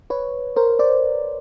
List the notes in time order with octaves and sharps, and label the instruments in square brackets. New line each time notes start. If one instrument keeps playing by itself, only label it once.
[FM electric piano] B4 C#5
A#4 C5
C5 D5